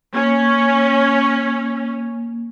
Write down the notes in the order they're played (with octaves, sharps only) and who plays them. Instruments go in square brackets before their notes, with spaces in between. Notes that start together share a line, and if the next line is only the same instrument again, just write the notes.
[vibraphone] A#3 [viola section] C#4